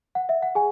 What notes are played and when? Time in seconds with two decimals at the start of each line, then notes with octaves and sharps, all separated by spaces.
0.15 F#5
0.29 E5
0.43 F#5
0.55 G#4 G#5